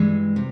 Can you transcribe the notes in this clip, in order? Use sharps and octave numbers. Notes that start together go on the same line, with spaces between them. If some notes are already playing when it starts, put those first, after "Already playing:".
Already playing: G2 E3 G#3
C3